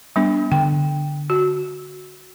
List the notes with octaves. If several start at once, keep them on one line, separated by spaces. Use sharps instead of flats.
G3 B3 D4
D3 G5
F#4